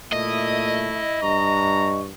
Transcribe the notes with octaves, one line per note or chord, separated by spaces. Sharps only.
A#2 A3 E4 D#5
G2 A#5 C#6